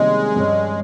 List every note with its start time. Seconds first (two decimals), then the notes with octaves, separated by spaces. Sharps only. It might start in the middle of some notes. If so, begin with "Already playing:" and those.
Already playing: C3 D#3 G3 G#3 A#3 C#4
0.36 G2 G3 C#4